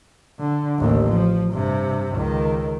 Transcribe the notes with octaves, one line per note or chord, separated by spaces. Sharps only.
D3
A1 D#2
F3
G2 C3
C#2 D#3